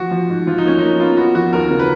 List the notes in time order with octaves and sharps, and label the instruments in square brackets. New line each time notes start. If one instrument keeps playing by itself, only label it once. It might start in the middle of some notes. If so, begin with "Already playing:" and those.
Already playing: [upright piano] F3 [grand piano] F#4
[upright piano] F3
G#2
[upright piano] F3 [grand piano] F4
[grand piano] D#4
[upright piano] A#3 [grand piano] C#4
[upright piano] A#3 [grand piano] D#4
[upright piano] B3 [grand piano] F4
[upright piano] B3 [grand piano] F#4
[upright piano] F3 [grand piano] F#4
[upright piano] D#2 [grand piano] A#4
[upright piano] C#3
[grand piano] B4